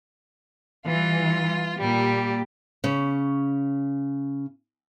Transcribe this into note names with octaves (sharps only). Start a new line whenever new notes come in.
E3 G3 F4
A#2 G3 G4
C#3 C#4